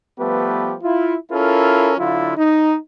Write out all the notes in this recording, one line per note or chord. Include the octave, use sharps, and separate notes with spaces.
F3 G3 A3 B3 G4 B4
E4 F4
C#4 E4 F4 A4 A#4
D3 F#3 E4 F4
D#4